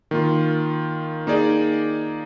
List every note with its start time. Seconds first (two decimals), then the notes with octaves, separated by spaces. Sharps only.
0.11 D#3 A#3 F4
1.27 A#3 D#4 G#4 D5